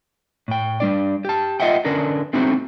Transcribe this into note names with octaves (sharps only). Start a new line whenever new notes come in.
A2 G5
G3 D4 D5
G4 A5
F4 D#5 E5 F#5 G5
D3 C#4 D4 A#4 B4
A3 B3 C4 D4 D#4 F#4